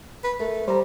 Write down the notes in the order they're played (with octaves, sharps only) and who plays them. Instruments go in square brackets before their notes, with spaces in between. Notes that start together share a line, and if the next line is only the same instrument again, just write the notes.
[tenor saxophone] B4
[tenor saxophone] A3 [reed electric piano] A#4
[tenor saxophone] G3 [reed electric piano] C5 A#5